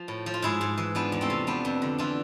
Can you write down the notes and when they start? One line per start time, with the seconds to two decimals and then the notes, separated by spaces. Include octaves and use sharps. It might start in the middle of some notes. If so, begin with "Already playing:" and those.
Already playing: F3 F4
0.08 A2
0.26 F3
0.34 F4
0.42 G#2 E4 G#4
0.61 G#2
0.78 E3
0.95 F3 B3 D4
1.12 E2
1.21 A3 C4
1.30 C3
1.47 F3 B3 D4
1.65 F2
1.82 D3
1.98 E3 D4 F4